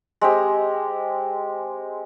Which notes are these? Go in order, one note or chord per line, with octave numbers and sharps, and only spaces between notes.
G#3 C4 G4